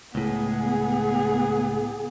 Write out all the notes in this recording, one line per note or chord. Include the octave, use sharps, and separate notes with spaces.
C#2 A2 B3 G#4